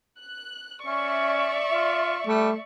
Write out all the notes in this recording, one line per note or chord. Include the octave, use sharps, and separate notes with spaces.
F#6
C#4 D5 E5 C#6
F4
G3 A3